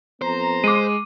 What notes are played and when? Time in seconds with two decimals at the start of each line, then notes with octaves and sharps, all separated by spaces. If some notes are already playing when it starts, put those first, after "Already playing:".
0.21 F2 B3 C5 A#5
0.64 G#3 D6 D#7